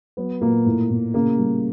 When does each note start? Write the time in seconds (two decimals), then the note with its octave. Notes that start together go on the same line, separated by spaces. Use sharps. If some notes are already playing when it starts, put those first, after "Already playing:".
0.17 F#3 B3
0.41 A#2 A#3
0.66 A2
0.90 A2
1.14 C#3 A#3
1.38 G3